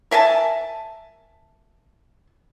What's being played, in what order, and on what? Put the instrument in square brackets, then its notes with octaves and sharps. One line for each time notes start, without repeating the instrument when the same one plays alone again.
[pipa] A#4 E5 G#5 A5